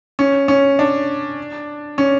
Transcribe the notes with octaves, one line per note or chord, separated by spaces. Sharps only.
C#4
C#4
D4
C#4